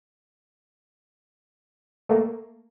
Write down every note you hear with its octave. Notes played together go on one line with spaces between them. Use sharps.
A3 A#3